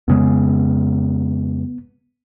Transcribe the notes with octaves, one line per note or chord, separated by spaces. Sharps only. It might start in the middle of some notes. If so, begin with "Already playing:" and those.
F2 C#3 G#3 B3